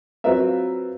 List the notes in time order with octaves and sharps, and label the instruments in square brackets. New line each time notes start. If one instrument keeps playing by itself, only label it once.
[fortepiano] F#3 C4 F4 A#4 B4 E5